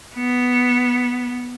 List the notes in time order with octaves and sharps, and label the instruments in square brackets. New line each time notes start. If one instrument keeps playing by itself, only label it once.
[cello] B3